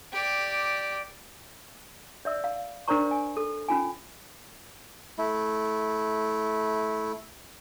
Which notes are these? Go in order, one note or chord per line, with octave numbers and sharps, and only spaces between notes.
G4 D5
D5 E5 E6
F5
D4 A#4 C5 D5 A#5 C#6
G#5
A4
C#4 F4 G#5
A3 E4